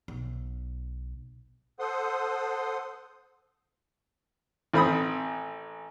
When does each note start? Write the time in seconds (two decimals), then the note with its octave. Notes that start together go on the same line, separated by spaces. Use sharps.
0.08 B1
1.79 A4 C5 F#5 C6 D#6
4.73 A1 C4 B5 D#6